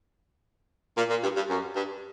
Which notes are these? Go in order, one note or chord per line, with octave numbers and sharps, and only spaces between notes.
A#2
A#2
G2
G2
F#2
G2